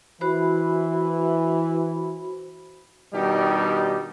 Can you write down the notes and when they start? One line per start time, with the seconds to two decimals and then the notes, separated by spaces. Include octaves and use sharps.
0.21 E3 F#4 C5 B5
3.13 B2 D#3 G3 D4 D#4 G4